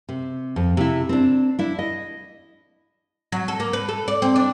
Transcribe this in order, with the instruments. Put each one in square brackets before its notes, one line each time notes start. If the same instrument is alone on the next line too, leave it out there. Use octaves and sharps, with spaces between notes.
[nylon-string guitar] C3
F2
C3 E4
C4 D4
D4 E4
D#5
[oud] F#3
A4
A#3
B4
A4
D5
C4
D4